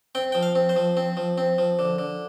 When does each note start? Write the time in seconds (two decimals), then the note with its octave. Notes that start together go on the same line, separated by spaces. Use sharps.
0.15 C4 G5
0.32 F3 G5
0.42 F5
0.55 C4
0.69 C5
0.76 F3
0.97 C4
1.17 F3
1.38 C4
1.58 F3
1.79 D3
1.98 D3